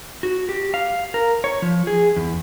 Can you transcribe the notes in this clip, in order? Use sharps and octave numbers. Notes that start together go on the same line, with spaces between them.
F#4
G4
F5
A#4
C#5
F3
G#4
E2